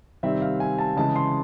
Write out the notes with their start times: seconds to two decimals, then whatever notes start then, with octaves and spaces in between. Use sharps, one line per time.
0.23 C3 D#3 G3 C4 E5
0.42 F5
0.60 G#5
0.79 A5
0.97 C#3 E3 G#3 A5
1.16 C6